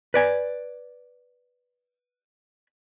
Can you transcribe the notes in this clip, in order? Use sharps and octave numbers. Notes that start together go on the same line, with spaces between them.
B4 D5 G#5